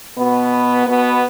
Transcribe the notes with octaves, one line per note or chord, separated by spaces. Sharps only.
B2 B3
B2 B3